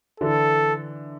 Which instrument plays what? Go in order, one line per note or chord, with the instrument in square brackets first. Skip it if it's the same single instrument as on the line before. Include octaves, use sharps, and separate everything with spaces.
[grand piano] D3 E3 [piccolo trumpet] A4